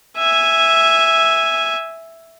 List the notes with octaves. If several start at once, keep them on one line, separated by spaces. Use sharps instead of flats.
E5 G#5